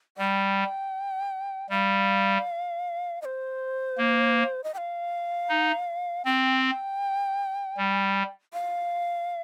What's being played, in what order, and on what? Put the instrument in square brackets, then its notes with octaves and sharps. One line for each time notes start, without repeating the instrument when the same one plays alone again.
[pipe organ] G3 [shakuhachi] G5
[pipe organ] G3 [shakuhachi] F5
[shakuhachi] D#5
C5
[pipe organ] A#3
[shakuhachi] D#5
G5
F5
[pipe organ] D#4
[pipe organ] C4 [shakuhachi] G5
[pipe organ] G3
[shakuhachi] F5